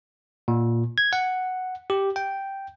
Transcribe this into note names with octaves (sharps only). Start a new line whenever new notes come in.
A#2
G#6
F#5
G4
G5